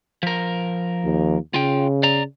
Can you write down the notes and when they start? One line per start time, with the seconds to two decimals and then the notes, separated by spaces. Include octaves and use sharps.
0.23 F3 A#4
1.04 D#2
1.54 C#3 F4 G5
2.03 D5 A#5